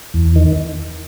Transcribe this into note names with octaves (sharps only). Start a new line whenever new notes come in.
E2
D#3